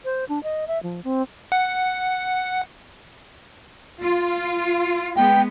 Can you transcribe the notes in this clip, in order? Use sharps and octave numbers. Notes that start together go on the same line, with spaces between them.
C5
D4
D#5
E5
F3
C4
F#5
F4
G#3 B3 G5